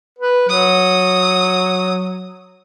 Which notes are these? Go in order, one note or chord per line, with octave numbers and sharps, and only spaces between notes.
B4
F#3 D#6